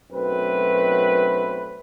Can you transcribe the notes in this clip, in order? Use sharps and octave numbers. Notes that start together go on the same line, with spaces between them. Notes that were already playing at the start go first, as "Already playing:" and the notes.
B1 F#2 F#3 A3 C4 B4